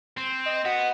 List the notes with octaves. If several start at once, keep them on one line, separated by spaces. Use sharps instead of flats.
C4
D#5
B3 F#4